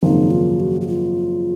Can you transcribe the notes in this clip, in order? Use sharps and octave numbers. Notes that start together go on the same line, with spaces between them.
G#1 F#2 C#3 F3 A#3 D#4
F4
F#4
F#4
F4